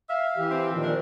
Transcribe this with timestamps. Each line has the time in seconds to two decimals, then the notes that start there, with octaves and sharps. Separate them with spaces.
0.09 E5 F5
0.37 E3 G4
0.50 C4
0.70 A#2 D#3 F3
0.83 D4 A#4